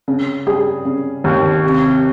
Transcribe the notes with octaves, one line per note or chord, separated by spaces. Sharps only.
C#3
G3 G#4
C#3
D#2
C3